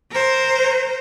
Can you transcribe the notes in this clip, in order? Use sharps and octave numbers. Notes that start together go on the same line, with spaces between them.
A#4 C5